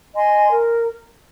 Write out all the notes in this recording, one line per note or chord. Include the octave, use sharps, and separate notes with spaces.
D#5 G#5 C6
A#4